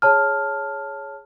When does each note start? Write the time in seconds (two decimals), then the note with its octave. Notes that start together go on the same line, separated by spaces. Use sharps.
0.02 G#4 C#5 A5 F6